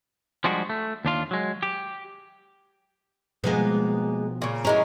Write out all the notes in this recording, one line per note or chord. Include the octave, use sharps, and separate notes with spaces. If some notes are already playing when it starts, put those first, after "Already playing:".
F3 G3 G#3 D4 F#4
A3
D#2 D4 F4
F#3 G#3
G4
B2 F3 G#3 A#3 B3
A#2 C#3
E3 G#3 C#4 A#4